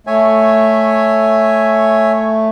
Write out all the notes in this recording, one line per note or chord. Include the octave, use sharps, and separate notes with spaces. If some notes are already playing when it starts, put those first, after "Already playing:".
A3 C#5 E5 G#5